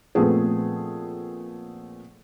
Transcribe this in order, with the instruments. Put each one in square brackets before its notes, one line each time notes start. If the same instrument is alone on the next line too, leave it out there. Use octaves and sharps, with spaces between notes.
[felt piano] A#2 F3 A3 B3 C4 G#4